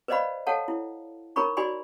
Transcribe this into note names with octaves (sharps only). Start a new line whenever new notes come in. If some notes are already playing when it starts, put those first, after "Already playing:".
B4 C5 D5 D#5 F5 B5
A4 C#5 F5 F#5 A5
E4
D#4 A#4 C#5 A#5 B5 C#6
D#4 F#4 D5 G#5 B5 C6